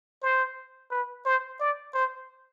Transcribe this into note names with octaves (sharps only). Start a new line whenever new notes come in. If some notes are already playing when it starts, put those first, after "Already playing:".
C5
B4
C5
D5
C5